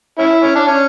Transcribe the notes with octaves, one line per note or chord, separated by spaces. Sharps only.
C#4 E4
C#4
D4
C#4